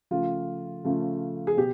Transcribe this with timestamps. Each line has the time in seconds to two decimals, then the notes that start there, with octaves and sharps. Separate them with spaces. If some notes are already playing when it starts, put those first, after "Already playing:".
0.11 C#3 F3 A3 F4
0.84 C#3 F3 A3
1.47 G#4
1.57 B2 G4